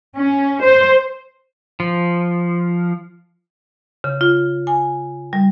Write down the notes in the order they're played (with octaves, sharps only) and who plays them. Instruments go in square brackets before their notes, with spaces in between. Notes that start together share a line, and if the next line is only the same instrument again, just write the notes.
[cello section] C#4
C5
[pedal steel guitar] F3
[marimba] C#3
F4
G#5
G3